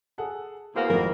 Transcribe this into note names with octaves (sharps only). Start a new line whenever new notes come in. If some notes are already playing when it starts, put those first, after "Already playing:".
G#4 A4 F#5
E2 B2 A#3 G#4 C5 F#5
G#1 F2 A3 A#4